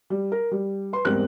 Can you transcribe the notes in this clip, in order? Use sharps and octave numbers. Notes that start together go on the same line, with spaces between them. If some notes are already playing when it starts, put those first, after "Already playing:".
G3
A#4
G3
B4 C6
E2 G#2 G3 C4 A#4 F#6